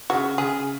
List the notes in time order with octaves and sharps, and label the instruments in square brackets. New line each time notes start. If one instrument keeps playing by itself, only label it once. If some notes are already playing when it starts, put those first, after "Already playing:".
[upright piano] C#3 [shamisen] F#4
[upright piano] C#3 [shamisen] G#4